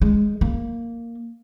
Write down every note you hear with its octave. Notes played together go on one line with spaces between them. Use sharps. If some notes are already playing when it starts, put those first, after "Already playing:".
G#3
A#3